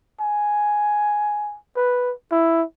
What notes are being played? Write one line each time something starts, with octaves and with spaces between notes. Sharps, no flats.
G#5
B4
E4